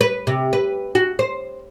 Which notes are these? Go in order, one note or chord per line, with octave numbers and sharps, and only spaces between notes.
B4
C3
B4
F#4
C5